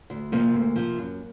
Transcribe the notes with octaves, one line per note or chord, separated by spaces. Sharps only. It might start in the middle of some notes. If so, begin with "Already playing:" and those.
D2
C3 F3 A#3
D2
C3 F3
F#2